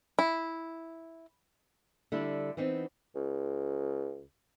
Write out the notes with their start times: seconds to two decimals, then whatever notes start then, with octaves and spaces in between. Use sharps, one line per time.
0.19 E4
2.12 D3 G3 D4 E4
2.57 E3 B3 C4 D#4
3.16 C#2